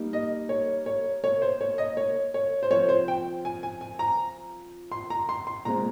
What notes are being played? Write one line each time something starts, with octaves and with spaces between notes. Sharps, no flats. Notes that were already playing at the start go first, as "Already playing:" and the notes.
Already playing: G3 A#3 D#4
D#5
C#5
C#5
C#5
C5
C#5
D#5
C#5
C#5
C5
F3 C4 F4 C#5
C5
G5
G#5
G#5
G#5
A#5
C6
A#5
C6
C6
A#2 G#3 C4 F4 A#5